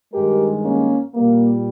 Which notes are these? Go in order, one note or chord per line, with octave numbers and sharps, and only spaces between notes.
G2 D#3 G#3 G4 A#4
A#3 C#4
A#2 G3 A#3